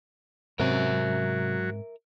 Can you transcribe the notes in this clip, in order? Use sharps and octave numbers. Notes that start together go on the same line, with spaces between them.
G#2 C3 F#3 C4 C#4 A#4 E5